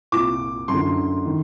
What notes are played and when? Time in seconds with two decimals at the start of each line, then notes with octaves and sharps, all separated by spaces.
0.12 C2 A#2 D6
0.68 F#2 D3 C6
1.26 D#3